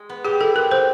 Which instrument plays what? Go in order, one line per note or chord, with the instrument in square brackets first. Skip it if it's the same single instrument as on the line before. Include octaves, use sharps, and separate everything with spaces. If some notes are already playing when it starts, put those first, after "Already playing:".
Already playing: [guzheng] G#3
B3
[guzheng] G4 [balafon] G#4
[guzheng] E4 [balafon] A4
[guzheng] C4 [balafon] A#4
[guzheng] C4 [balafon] C5